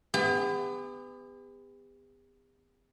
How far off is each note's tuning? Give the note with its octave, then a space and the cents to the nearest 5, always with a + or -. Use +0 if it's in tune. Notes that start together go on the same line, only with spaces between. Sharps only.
B3 +30 G4 +45